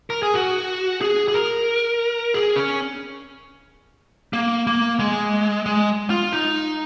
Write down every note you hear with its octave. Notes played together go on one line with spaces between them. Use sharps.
A#4
G#4
F#4
G#4
G#4
A#4
G#4
C#4
A#3
A#3
G#3
G#3
F4
D#4